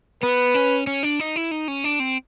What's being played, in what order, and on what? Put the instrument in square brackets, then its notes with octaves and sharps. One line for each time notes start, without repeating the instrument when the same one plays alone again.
[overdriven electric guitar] B3 [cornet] B4
[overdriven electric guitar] C#4
C#4
D4
D#4
E4
D#4
C#4
D4
C4